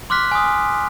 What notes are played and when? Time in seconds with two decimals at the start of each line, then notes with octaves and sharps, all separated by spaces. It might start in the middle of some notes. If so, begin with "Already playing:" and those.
0.10 C6 D6 F6 F#6 B6
0.31 G#5 D#6